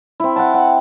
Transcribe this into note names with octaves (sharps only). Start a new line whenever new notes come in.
C4 E4
F#5 G5 A5
F#5